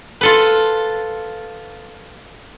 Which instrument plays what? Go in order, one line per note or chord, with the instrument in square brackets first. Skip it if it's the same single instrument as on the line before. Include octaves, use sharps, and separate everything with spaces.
[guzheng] F4 A4 B4